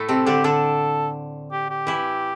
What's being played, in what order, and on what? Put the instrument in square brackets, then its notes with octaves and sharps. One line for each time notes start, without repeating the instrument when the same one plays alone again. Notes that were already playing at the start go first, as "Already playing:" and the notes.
Already playing: [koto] A2 A3
[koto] C3 C4 [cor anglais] A4
[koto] D3 D4 [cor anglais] G4
[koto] D3 D4 [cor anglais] A4
[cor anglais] G4
G4
[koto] E3 E4